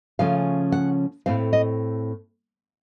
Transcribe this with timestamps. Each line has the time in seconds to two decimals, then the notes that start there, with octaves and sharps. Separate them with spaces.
0.19 C#3 F3 A3 C#4 F5
0.72 F#5
1.26 A2 A3 C4 F5
1.53 D#5